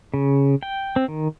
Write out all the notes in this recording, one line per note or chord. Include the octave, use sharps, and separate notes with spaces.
C#3
G5
C4
D#3